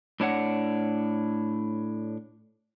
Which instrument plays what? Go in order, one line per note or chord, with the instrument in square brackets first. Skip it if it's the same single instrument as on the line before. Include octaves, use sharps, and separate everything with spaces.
[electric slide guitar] A2 D4 C#5 F#5